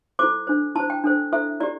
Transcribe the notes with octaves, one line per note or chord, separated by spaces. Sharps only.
E4 A4 C5 D6
D4 C5
E4 C5 A5
G5
D4 A4 C5
E4 A4 C5 E5
E4 G4 D5